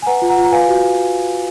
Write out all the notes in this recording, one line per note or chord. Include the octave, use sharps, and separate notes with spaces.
G#5
B4 F#5 A#5
F4
F#5 A#5
F4
A#5
B4 F5 G#5
F#4